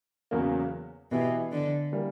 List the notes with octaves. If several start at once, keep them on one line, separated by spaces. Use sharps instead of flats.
E2 C#3 F#3 A#3
B2 E3 B3 E4 G4
D3
E3 G3 A#3